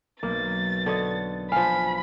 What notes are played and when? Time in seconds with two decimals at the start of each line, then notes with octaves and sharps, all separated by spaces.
0.23 B1 A#3 A6
0.86 D3 C#5 D#5
1.52 F3 F5 G#5 B5